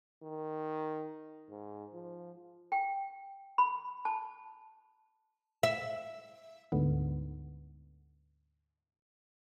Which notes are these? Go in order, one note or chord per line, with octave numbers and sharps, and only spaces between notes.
D#3
G#2
F3
G5
B5
A5
E5
D2 G#2 D3 B3